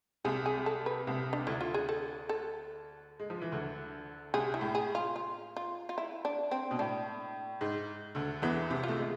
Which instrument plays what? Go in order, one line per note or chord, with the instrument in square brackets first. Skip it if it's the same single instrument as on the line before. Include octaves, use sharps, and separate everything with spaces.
[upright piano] C2 C3 [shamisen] G#4
[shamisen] G#4
A4
B4
[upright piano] C2 C3
[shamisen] D4
[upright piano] D2 D3 [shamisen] E4
[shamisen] F4
G#4
A4
A4
[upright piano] G#3
F3
E3
D2 D3
[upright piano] C2 C3 [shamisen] G#4
[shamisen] E4
[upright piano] A2
[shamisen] G#4
F4
F4
F4
F4
E4
D4
C4
[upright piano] B2
[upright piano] A2 [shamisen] D4
[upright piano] G#2
D2 D3
[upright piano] E2 E3 [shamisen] B3
[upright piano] C2 C3
[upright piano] A3 [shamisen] F4
[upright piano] G#3